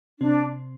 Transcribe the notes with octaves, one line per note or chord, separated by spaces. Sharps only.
C3 C4 D4